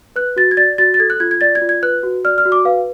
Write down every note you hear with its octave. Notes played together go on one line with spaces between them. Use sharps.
B4 F#6
F#4 A6
G#6
D5 A6
F#4 A6
A6
A4 G#6
F#6
F4 G#6
G#6
D5 A6
G#6
F4
G#6
B4 F#6
F#4
D5 F6
F6
F#4
D6
B4 F5